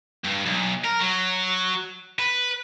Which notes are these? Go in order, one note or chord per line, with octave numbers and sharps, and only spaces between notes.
G2
B1
A#4
F#3
B4